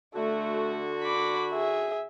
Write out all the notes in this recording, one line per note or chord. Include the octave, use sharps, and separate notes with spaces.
D3 A3 F#4
B5 D6
G#4 E5